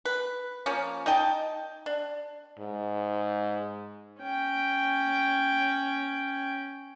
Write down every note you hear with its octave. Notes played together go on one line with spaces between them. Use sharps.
B4
F3 A#3 C#4
D#4 D#5 G5 A5
D4
G#2
C#4 G5